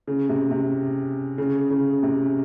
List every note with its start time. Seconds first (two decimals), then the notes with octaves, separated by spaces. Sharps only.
0.07 C#3
0.29 C3
0.51 C3
1.38 C#3
1.70 C#3
2.03 C3